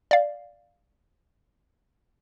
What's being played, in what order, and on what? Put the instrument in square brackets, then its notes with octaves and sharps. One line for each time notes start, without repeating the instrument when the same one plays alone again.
[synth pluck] D5 F5